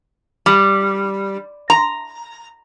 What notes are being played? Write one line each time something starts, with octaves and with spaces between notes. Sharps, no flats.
G3
A#5